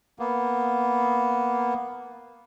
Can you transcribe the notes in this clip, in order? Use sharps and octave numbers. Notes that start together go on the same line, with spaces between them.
A#3 B3